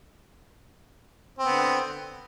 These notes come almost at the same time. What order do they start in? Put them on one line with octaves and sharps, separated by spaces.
C4 B3 D3